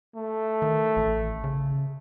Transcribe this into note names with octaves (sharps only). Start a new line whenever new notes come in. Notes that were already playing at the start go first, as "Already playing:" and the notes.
A3
D#3
A1
C#3